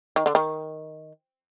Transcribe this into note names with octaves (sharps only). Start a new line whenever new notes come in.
D#3
D3
D#3